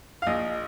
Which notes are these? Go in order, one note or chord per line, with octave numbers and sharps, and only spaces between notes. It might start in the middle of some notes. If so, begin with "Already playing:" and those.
F5
A#1 D#5